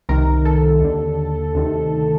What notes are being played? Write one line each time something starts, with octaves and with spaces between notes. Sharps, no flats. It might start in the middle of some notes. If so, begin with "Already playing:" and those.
C2 C3 D#3 A#4
A4
D#2 D3
D2 C3 D#3